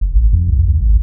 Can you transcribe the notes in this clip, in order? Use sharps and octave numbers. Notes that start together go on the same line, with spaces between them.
F#1
A1
F2
C2
C#2
G#1